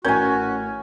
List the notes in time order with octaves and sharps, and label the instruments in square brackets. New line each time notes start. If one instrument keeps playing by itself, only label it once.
[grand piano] A1 A#4 G6 [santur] C#4 G#5 [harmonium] F#4